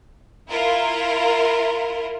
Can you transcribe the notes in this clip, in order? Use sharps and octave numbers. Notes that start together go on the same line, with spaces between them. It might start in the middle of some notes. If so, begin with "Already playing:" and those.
E4 F4 A#4